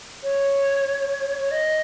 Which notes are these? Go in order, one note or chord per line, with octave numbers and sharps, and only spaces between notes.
C#5
C#5
D#5